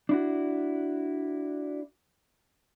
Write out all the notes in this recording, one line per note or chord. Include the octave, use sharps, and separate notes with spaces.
D4 E4 F#4